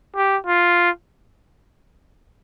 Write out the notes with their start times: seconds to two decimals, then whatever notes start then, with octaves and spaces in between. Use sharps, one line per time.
0.16 G4
0.47 F4